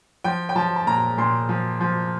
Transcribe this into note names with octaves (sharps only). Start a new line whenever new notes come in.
F3 G5
G5
F3 A5
A5
A#2 A#5
A#2 C6
F3
F3